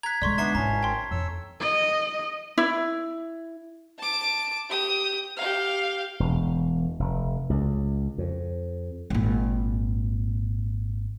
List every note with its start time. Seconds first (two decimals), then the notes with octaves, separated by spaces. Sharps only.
0.03 A#5 F#6 G#6 B6
0.22 D3 G#3 D5 C6 C#6
0.38 B3 D4 D#4 E5 A5 C#6 C7
0.55 G#1 C#4 E4 A#5
0.83 G5 C6
1.11 F2 C#5 E6
1.61 D#5
2.58 E4
3.98 A5 D6
4.69 G4 D#6
5.37 G4 F5
6.20 E1
6.99 F1
7.50 C#2
8.18 F2
9.10 G#1 A#2